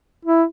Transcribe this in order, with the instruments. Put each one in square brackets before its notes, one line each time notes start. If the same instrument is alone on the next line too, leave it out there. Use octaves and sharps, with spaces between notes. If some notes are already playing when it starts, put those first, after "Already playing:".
[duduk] E4